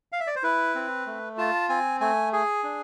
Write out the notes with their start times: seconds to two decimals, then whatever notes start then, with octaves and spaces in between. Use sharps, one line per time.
0.12 F5
0.20 E5
0.27 D5
0.36 C5
0.43 E4 B4
0.75 C4
1.07 A3
1.38 F4 A5
1.69 C4 G#5
2.00 A3 G#5
2.33 G#4 G#5
2.64 D4